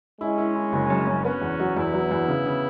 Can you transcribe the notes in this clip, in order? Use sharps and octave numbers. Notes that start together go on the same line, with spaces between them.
G#3 C#4 E4
E4
E4
F#1
F#2
F#2
B3 C#4 F#4
E2
F#3
E2 B3 E4
F#3
E2
C#3
C#3